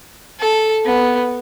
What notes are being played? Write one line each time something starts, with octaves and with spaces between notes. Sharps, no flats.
A4
B3